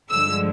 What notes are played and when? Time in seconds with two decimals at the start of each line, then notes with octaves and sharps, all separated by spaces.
0.10 G2 D3 F3 G#3 E6